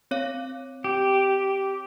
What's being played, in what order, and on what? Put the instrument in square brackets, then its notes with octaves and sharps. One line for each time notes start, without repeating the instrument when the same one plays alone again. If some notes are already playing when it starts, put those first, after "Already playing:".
[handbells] C4 C#5 F5
[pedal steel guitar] G4